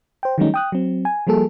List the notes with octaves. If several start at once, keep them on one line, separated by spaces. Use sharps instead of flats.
C5 G5
D#3 F#3 G3 A3 C#4 D#4
G5 D#6 F#6
F#3 C4
G#5
F3 G3 A#3 G#4 A4